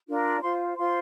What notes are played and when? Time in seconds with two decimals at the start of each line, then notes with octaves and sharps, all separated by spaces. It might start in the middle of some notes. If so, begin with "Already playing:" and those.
0.08 D4 F4 A#4
0.42 F4 C5 C6
0.77 F4 C5 C6